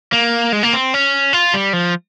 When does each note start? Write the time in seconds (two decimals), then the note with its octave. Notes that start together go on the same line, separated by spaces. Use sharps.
0.13 A#3
0.52 G#3
0.63 A#3
0.73 C4
0.94 C#4
1.33 F4
1.54 G3
1.73 F3